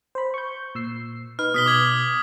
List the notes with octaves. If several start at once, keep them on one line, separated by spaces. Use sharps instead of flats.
C5 B5
C#6 G6
A#2 E6 C7
D#4 B4 F6
B2 D#6 B6 G7
D6 G#6 F#7